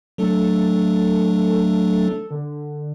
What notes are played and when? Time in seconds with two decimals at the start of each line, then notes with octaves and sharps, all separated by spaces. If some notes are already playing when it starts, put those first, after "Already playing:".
0.18 F#3 A3 D4 A4
2.31 D3